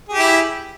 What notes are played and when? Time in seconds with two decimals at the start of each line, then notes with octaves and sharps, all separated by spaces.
0.09 G#4
0.13 G4
0.18 E4